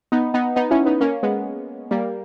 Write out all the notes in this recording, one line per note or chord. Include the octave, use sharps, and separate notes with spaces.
B3 D#4
B3 D#4
B3 D#4
C#4 E4
B3 D#4
A#3 C#4
G#3 B3
G3 A#3